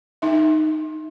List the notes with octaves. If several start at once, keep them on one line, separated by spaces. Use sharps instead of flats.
D#4 E5